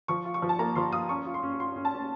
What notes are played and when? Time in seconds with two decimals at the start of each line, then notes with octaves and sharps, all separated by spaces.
0.08 F3 C#6
0.25 F4
0.34 C#6
0.42 F3
0.49 A5
0.59 A#3 A#5
0.75 F3 C6
0.92 F4 D#6
1.09 C#4 C#6
1.26 F4
1.34 C6
1.43 C#4
1.60 F4 C6
1.76 C#4
1.85 A5
1.94 C#4